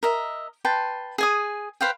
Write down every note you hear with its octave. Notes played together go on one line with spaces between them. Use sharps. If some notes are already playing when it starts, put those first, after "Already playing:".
A#4 D#5 E5
B4 G5 A5 C6
G#4 G#5 D#6
B4 C5 F5 G5